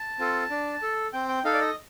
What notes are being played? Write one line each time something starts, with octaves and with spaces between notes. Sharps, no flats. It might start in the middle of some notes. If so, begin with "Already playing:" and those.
Already playing: A5
C4 F4 A4
D4
A4
C4 G5
G5
D#4 A4 F5
D5
D#5